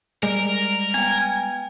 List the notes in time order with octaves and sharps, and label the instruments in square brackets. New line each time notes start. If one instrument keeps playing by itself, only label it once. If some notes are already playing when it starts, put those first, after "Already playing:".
[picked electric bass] G3 G#3 [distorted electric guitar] A#4
[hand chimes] B3 G5 [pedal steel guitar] G#5